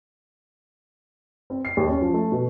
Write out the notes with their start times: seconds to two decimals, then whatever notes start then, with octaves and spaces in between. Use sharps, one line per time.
1.50 C4
1.65 C7
1.77 D#2
1.89 C#4
2.02 F3
2.14 A3
2.32 B2